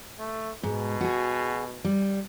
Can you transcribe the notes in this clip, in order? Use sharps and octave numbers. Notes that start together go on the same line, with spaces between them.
A3
G#2 B2
F#4 G#4
G3